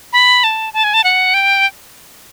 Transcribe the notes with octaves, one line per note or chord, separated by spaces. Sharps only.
B5
A5
A5
G#5
A5
F#5
G5